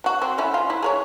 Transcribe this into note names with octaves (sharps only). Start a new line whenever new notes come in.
F#3 F#4
F#3 C4
A3 C#4 E4
F4
E4
G#4 A#4 C#5